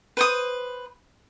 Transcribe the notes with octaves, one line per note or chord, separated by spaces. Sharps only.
B4 C5 D#6